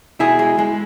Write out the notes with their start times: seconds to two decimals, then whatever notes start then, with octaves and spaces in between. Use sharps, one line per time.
0.19 B2 E4 G#4
0.39 G#3
0.59 G#3